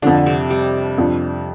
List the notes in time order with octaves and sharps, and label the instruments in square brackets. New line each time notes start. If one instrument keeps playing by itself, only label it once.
[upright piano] F2 F3 D4 [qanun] D3
[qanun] C3
G3
[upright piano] F2 F3 D4